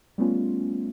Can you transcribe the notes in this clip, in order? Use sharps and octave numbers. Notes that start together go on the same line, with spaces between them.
G3 A3 B3 C#4 F4